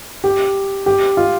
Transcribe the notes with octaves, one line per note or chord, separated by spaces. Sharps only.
G4
G4
F4